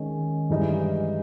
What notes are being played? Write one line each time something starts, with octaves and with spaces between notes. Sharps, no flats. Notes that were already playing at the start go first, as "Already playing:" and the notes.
Already playing: D#3 G#3 C#4
G2 E3 G#3 D#4